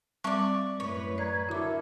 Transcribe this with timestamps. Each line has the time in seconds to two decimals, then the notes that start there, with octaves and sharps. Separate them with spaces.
0.24 G3 C4 D5 E5 C#6
0.80 F#2 A2 B4 C#5
1.18 D5 A#5 G#6
1.49 D3 E4 F#4 A4 A#4 D6